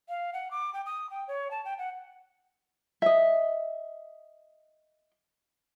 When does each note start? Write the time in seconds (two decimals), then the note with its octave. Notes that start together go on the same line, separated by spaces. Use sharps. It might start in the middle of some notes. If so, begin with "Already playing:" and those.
0.09 F5
0.33 F#5
0.51 D6
0.74 G5
0.86 D#6
1.10 G5
1.28 C#5
1.51 A5
1.65 G5
1.78 F#5
3.02 D#5 E5